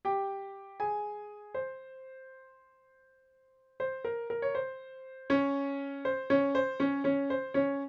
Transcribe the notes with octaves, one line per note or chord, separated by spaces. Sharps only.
G4 G5
G#4 G#5
C5
C5
A#4
A#4
C#5
C5
C#4 C#5
C5
C#4 C#5
C5
C#4 C#5
C#4 C#5
C5
C#4 C#5